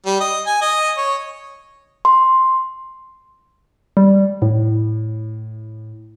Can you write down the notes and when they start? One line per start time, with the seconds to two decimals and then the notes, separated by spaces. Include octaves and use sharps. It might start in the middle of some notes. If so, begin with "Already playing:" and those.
0.06 G3
0.20 D#5
0.46 G#5
0.61 D#5
0.97 C#5
2.05 C6
3.97 G3
4.42 A2